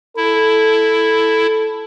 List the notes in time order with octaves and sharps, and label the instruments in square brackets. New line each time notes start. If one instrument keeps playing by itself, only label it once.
[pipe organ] E4 [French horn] A4